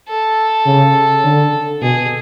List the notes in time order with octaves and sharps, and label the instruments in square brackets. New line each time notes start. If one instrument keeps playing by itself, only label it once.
[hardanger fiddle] A4
[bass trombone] C#3
D3
[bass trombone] B2 [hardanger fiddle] G#4